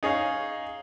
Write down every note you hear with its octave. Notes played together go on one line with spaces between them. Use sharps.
D#4 G#4 C#5 F5